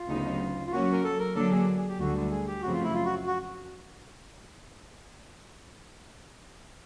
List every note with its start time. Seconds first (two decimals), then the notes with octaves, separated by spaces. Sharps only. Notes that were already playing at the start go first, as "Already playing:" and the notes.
Already playing: F4
0.08 D2 C#3 F#3 B3 D#4
0.67 F4
0.71 F#3 A#3 C#4 F#4
0.92 A#4
1.04 A4
1.19 A#4
1.35 D3 F#3 A#3 D4 A4
1.51 G#4
1.78 G#4
1.89 G4
1.99 D2 D3 G3 F#4
2.31 G#4
2.47 G4
2.62 F#2 C#3 F3 A3 C4 F#4
2.73 F4
2.84 E4
2.94 F4
3.05 F#4
3.26 F#4